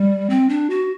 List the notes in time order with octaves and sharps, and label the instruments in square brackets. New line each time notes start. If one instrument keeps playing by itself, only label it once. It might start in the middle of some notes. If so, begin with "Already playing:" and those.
Already playing: [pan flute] G3
C4
D4
F#4